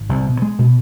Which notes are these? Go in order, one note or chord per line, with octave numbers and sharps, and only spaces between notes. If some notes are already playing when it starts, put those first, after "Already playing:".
Already playing: G#1
C2
B2
G#3
B2